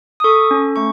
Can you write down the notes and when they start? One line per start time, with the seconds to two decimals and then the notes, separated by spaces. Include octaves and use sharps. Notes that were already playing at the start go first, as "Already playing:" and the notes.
0.20 D#6
0.24 A4 C#6
0.51 C#4
0.76 A3 C#6